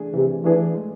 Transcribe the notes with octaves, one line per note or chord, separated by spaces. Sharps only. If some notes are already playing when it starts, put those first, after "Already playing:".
Already playing: E3 A3 D4 G#4
C3 E3
E3 A3 D4 G#4
G#3